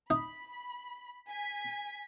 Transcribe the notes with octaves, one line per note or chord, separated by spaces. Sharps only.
D#4 B5
G#5 B6